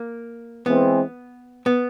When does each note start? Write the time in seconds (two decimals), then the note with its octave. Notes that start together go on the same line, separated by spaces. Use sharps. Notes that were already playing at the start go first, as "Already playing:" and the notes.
Already playing: A#3
0.66 E3 G#3 B3 C4
1.66 B3